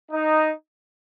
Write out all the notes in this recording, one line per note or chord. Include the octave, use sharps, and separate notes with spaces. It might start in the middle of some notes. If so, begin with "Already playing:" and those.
D#4